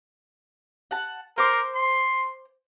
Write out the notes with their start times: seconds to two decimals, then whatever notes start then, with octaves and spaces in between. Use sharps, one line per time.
0.91 F#5 A5
1.38 A#4 C5 D6
1.75 C6